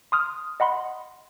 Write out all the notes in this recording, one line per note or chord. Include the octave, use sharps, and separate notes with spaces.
C6 D#6 F6
D#5 F#5 B5 C6